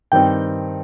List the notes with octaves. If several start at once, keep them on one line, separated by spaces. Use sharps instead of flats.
G2 D#3 G3 C4 D#4 G5